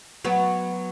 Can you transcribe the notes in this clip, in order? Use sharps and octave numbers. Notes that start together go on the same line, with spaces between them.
F#3 B3